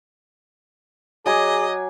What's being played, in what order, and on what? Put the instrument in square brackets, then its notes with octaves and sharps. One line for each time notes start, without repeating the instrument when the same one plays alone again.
[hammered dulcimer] F#3 G#5 D6 [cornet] G#4 [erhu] D#5